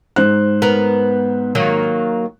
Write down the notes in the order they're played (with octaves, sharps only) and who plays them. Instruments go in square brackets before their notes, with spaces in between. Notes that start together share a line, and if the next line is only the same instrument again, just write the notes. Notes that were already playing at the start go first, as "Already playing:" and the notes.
[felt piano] G#2 C5 F#6
[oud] B3 A#4
D#3 F#3 A#3